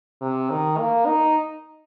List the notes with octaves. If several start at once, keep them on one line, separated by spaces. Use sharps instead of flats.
C3
D#3
A#3
D#4